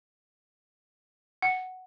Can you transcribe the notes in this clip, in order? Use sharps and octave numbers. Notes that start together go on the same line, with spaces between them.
F#5